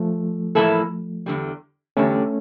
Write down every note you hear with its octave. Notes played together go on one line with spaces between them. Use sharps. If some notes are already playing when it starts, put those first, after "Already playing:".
Already playing: F3 A3
A2 E3 A#3 E4 A4
E2 D3 G3
E2 D3 G3 A3 C#4